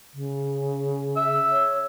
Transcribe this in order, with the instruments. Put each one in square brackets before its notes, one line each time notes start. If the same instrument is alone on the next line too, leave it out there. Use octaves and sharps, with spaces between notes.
[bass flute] C#3
[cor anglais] E5
[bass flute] C#5